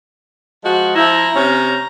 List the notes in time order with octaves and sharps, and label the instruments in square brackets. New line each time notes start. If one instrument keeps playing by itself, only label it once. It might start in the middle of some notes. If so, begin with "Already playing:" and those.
[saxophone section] F3 G#3 F#4
[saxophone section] F3 E4 [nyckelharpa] A#5
[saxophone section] C3 C#4